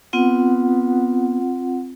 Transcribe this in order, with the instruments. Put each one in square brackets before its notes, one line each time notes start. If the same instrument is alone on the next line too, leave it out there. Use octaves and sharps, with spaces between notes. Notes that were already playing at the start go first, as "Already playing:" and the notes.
[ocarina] B3 [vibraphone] C4 F4 F#5